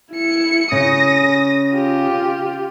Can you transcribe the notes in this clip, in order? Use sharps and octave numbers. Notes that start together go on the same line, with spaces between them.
E4 C#7
C#3 D#6 A#6
F4 G4